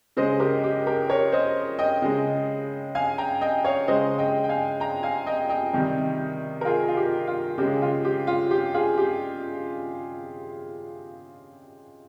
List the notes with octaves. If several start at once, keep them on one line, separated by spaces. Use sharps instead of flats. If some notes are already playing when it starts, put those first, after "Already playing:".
C#3 G#3 C5 D#5
G4 A#4
G4
G4 A#4
A#4 C#5
C5 D#5
D#5 G5
C#3 G#3
F5 G#5
G5 A#5
D#5 G5
C#5 F5
C#3 G#3 C5 D#5
D#5 G5
G5
F5 G#5
G5 A#5
F5 G#5
D#5 G5
D#5 G5
C3 D#3 G3
A#4
F4 G#4
F4
G4
F4
C#3 G#3 G4
F4
G4
F4
G4
F4 G#4
G4